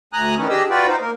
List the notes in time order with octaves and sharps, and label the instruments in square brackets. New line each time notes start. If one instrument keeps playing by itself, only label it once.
[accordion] D2 G#5 A#5 D#6 F#6
D#3 E3 C#4
D4 G4 G#4 D#5 E6
F4 F#4 B4 D5 G5
D#4 C5
A#3 A#4